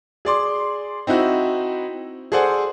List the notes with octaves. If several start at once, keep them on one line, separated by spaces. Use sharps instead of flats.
G#4 D5 C6 D6
C4 D#4 E4 F#4
G#4 A4 C5 D5 F#5 G#5